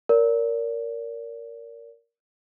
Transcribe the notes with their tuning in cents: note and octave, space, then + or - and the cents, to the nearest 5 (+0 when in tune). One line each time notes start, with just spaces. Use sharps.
A#4 +0 D5 -35